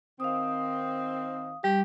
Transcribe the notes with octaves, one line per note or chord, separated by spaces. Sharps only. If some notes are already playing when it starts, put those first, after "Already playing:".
D#3 C4 F5 D#6
G3 G4